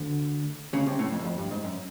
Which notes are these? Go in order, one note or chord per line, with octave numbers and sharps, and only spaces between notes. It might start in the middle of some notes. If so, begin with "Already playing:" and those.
Already playing: D2 D3
C#2 C#3
C2 C3
A2
F2
F#2
F2
G2
G#2
F#2